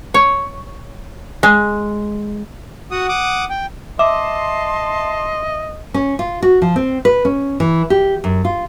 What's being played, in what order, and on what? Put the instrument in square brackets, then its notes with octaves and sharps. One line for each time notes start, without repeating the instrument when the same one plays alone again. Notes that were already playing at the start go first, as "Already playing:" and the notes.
[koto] C#5
G#3
[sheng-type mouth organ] F#4 F#5 D#6
F#5 D6 D#6
G5
[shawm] D#5 [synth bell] E5 [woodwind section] A5 C6 [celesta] D6
[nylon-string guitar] C#4
F4
F#4
F3
C4
B4
C#4
E3
G4
F#2
F4